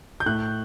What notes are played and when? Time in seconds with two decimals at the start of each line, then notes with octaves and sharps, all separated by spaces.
0.20 G6
0.26 A2 F#6